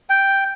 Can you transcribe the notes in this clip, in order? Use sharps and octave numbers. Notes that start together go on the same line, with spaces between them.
G5